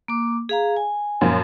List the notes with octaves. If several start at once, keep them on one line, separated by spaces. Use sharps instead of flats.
A#3 D6
G#4 F5 A#5
G#5
F#2 A#2 F3